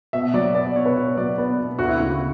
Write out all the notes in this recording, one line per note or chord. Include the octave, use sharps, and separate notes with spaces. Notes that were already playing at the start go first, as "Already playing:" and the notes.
B2 E5
F#3 D5
B3 D5
D5
B2 C#5
B4
B2 C#5
F#3 D5
B3 D5
B2
D2 F#4
E4
C#3 E4
F#4